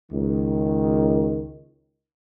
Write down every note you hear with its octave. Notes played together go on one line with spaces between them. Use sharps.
C#2 D#3